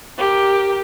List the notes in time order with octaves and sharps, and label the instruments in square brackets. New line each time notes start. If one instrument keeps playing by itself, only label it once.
[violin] G4 A#4